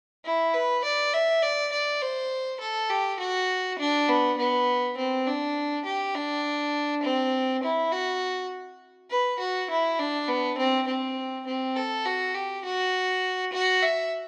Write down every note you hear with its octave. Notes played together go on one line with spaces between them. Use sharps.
E4
B4
D5
E5
D5
D5
C5
A4
G4
F#4
D4
B3
B3
C4
D4
G4
D4
C4
E4
F#4
B4
F#4
E4
D4
B3
C4
C4
C4
A4
F#4
G4
F#4
F#4
E5